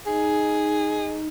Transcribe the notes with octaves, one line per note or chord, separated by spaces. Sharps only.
D#4 G#4